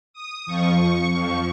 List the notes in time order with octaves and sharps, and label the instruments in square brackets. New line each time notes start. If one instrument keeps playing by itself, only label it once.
[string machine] D#6
F2 F3 C#6
C#6
F2 F3 C#6